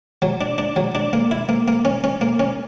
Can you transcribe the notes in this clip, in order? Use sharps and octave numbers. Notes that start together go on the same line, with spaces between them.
F#3
D4
D4
F#3
D4
A#3
E4
A#3
A#3
C#4
C#4
A#3
C#4